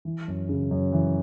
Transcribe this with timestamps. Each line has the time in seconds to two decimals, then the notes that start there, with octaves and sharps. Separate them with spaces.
0.05 E3
0.28 F#2
0.49 C#3
0.71 F#2
0.92 E3